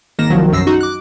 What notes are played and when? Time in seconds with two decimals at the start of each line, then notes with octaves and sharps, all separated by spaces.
0.19 G#1 D#3 A#3 A#6 E7
0.30 C2 D#3 F3 F#3
0.52 B1 F#2 E6 A#6 C7
0.67 D#4 F#4
0.81 D6 F#6